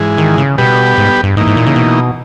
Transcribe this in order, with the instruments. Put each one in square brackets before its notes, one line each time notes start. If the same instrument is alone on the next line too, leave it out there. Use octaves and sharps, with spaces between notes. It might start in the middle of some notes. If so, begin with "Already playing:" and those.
Already playing: [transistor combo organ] G#2 E3 G#3
[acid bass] D#3
C#3
[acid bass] B2 [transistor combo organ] G3 B3 G4 B4
[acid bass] G#2
G2
[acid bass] G#2 [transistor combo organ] E3 A#3 D#4
[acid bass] G#2
A#2
C#3
B2